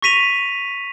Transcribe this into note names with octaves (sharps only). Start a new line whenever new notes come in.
C#6 A#6 B6 D#7 F7